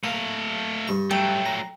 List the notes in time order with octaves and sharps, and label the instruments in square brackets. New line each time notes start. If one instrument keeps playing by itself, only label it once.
[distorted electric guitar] A3 F5 [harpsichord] A#3
[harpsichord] G2 C#6
[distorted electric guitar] F#3 A3 [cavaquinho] G5
[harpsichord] A#5